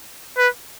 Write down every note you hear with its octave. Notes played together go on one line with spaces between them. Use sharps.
B4